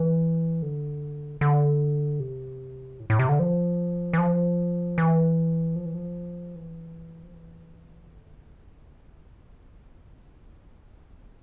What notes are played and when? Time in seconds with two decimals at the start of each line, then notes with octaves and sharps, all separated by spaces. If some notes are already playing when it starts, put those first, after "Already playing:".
Already playing: E3
0.62 D3
1.41 D3
2.20 C3
3.00 A2
3.10 A2
3.19 C3
3.29 D3
3.39 F3
4.13 E3
4.18 F3
4.98 E3
5.76 F3
5.86 E3
5.94 F3
6.56 E3
7.24 F3
7.34 E3
8.13 D3
8.93 C3
9.72 E3